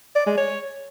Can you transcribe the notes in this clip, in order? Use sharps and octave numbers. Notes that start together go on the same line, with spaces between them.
D5
G#3
C#5